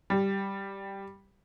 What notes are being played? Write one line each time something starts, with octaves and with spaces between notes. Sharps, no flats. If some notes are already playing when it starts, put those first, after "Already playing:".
G3